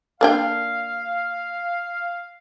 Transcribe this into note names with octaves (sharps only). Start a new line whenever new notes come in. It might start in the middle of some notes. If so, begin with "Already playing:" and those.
A#3 D4 F5 G5